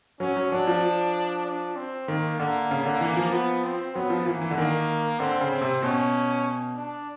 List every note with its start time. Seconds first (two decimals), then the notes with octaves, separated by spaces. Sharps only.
0.20 F#3 C#4
0.36 F#3
0.52 F#3 D4
0.67 F3
1.46 D4
1.76 C4
2.08 D#3 A#3
2.40 D3 A#3
2.71 C#3
2.86 D3
3.01 E3
3.17 F3
3.32 B3
3.64 C4
3.95 F#3 B3
4.10 F3
4.26 E3 A#3
4.42 E3
4.51 D3
4.58 D#3 A#3
5.20 D3 C4
5.41 C#3
5.51 C4
5.61 C3
5.83 B2 C#4
6.76 D4